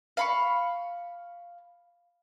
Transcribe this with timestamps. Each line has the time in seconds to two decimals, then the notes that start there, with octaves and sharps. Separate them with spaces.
0.17 F5 B5 C#6